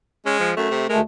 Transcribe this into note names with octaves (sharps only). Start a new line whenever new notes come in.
G#3 C#4
F3
F#2 A3
C3
D2 G#3 A3 A#4